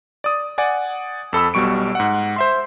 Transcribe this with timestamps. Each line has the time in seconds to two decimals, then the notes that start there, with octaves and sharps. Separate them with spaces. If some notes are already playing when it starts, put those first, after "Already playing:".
0.24 D5 D#6
0.58 D5 F#5 G#5
1.33 F2 A4 B5 E6
1.54 B1 B2 G3 C#6 D7
1.95 G#2 F#5
2.36 C5 E5 C6